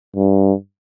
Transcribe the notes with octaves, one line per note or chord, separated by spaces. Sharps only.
G2